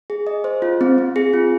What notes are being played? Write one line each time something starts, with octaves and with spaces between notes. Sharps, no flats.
G#4
D#5
C5
F4
C4
C4
G#4
F4